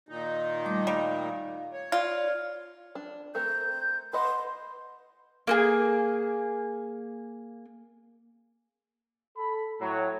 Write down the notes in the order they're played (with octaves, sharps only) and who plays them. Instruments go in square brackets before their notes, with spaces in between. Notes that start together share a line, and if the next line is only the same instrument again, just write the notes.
[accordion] A#2 D#3 D#4
[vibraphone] G3 A3 D6
[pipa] G3 [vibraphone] F5
[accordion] C#5
[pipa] F4 [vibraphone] D5
[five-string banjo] D4
[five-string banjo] A3 C4 A#4 [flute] G6
[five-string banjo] B4 D#5 F#5 [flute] C6
[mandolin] A#3 F#4 G#4
[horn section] A4 B5
A2 F#3 C#5